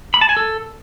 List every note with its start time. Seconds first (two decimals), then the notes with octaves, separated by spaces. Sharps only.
0.14 B5
0.21 A5
0.29 G#5
0.37 A4